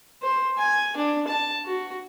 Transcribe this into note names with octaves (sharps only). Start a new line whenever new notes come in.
C5
G#5
D4
A5
F#4